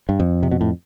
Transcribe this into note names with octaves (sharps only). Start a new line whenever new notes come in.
G2
F2
C3
B2
A2